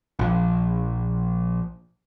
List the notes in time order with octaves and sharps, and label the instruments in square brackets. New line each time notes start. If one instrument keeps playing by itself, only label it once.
[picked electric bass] A#1 F3